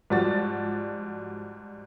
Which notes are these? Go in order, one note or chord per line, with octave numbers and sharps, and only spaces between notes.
G#2 F3 G3 F#4 A6